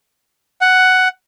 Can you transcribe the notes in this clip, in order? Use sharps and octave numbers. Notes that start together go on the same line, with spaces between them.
F#5